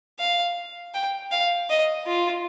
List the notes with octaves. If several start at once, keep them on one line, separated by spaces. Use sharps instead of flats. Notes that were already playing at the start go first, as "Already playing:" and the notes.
F5
G5
F5
D#5
F4